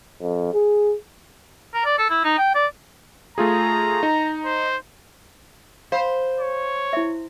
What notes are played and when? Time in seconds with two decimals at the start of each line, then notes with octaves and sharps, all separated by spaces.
0.21 F2
0.54 G#4
1.74 A#4
1.85 D5
1.98 A4
2.10 E4
2.24 D#4
2.38 G5
2.55 D5
3.38 A3 F4 G#4 A#5
4.03 D#4
4.45 C5
5.92 C5 F5 B5
6.40 C#5
6.93 E4 E5